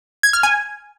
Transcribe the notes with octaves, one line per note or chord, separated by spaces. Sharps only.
G#6
F6
G#5